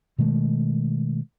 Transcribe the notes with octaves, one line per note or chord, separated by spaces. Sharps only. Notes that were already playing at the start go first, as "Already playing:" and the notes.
B2 D#3 G#3 A3